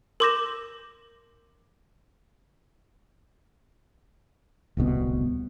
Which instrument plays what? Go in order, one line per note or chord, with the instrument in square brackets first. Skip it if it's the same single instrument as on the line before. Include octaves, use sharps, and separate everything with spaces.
[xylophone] A#4 C6 D6 G6 A#6 E7
[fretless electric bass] D1 C2 B2 B3